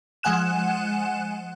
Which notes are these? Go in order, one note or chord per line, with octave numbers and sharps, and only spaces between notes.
F3 G#3 F#5 G#5 F#6 E7